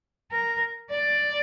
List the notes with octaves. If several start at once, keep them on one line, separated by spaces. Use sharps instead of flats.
A#4
D5